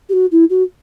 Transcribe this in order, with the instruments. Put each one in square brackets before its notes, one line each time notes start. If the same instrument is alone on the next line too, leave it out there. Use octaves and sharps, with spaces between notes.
[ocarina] G4
F#4
E4
F#4